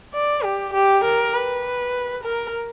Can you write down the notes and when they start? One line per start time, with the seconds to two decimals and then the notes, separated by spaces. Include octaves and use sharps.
0.14 D5
0.44 G4
0.74 G4
1.04 A#4
1.34 B4
2.24 A#4